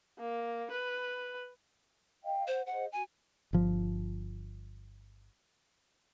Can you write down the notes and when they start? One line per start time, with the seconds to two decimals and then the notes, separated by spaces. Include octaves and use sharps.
0.19 A#3
0.71 B4
2.25 D#5 F5 G5
2.47 C5 F#5
2.67 G#4 C5 D#5 F#5
2.92 F#4 G#5
3.53 G1 F3